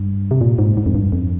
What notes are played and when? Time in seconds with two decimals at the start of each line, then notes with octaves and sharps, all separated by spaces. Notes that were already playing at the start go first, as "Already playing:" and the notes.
Already playing: G2
0.31 C3
0.41 A#2
0.59 G#2
0.77 G#2
0.86 F2
0.95 G2
1.12 F2